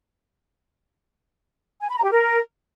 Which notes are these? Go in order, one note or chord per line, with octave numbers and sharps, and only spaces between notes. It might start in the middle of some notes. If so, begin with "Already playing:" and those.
G#5
B5
A#5
G4
A#4